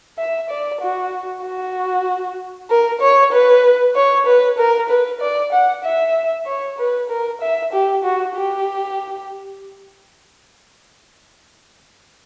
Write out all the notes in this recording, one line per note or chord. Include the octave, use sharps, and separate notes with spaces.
E5
D5
F#4
F#4
A#4
C#5
B4
C#5
B4
A#4
B4
D5
F#5
E5
C#5
B4
A#4
E5
G4
F#4
G4